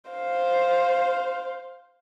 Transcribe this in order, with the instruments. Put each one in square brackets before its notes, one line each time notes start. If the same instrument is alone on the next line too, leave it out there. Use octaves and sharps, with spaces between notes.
[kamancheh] C5 F5